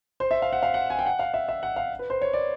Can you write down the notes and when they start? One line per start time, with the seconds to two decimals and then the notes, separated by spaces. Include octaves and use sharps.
0.20 C5
0.31 E5
0.42 F5
0.53 F#5
0.63 F5
0.74 F#5
0.90 G#5
0.99 G5
1.06 F#5
1.19 F5
1.34 E5
1.48 E5
1.63 F#5
1.76 F5
1.99 B4
2.10 C5
2.21 C#5
2.33 D5